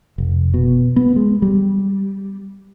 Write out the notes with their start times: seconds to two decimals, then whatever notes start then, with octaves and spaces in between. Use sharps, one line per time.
0.18 F1
0.54 B2
0.96 B3
1.16 G#3
1.42 G3